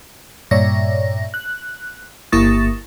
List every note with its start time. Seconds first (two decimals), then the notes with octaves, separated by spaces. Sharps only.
0.51 G2 A#2 C#5 D5 E5 A#6
1.34 F#6
2.32 G1 A#3 E4 C#6 D#6 A6